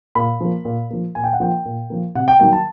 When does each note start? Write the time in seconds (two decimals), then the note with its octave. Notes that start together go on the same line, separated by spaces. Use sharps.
0.15 A#2 B5
0.40 F3 A#3
0.65 A#2
0.90 F3 A#3
1.15 A#2 G#5
1.24 G5
1.33 F#5
1.40 F3 A#3 G5
1.65 A#2
1.90 F3 A#3
2.15 C3 F#5
2.28 G5
2.40 D#3 F#3 A#3 G5
2.53 A5